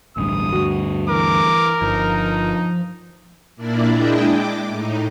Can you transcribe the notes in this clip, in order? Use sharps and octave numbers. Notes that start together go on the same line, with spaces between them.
A1 D2 G2 D#6
D2 G2 F#4
E3 A#4 D6
G1 F3 D#4
A#2 A#3 D4 E4 D5
G#3 D4 E4 D#5 G5
D6
A2 D#4